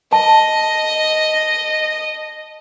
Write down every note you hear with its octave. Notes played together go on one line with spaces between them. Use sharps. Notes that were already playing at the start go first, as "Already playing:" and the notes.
D#5 A5